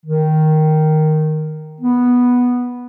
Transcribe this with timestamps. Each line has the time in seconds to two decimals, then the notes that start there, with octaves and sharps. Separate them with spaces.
0.05 D#3
1.80 B3